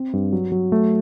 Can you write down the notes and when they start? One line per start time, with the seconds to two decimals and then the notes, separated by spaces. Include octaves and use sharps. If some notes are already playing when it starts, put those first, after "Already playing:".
Already playing: C4
0.13 G2
0.32 F#3
0.52 F#3
0.72 A3